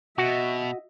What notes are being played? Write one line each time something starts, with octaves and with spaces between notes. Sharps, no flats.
B2 F#4 D#5 E5